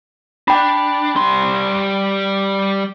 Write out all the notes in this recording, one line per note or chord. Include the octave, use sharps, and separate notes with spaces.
D4 G5 B5
G3 C6